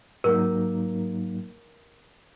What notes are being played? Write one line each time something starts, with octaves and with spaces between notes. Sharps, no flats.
G#2 F#3 A#3 D#4 A#4